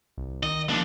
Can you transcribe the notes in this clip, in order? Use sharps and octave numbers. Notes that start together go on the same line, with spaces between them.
C2
D#3 D#5
F3 A#3 D4